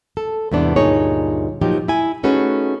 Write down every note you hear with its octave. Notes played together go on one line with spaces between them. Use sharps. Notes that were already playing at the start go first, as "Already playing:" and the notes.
A4
E2 G#2 C3 E3 B3 D4
D2 G2 A#2 D#4 G#4 C#5
A#2 F3 F#3 D#4 G4
E4 G#5
A3 C#4 D#4 F#4 G#4 B4